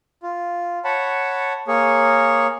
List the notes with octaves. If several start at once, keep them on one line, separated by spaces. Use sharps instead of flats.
F4
C#5 F#5 A5 B5
A#3 G#4 C#5